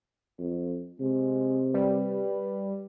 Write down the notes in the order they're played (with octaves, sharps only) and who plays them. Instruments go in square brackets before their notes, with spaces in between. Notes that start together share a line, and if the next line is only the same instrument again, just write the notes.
[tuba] F2
[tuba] C3 [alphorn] G#3
[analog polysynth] G3 [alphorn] B4